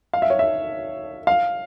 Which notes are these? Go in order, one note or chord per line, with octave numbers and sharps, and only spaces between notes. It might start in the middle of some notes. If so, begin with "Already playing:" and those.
F5
E5
C#5
E5
F5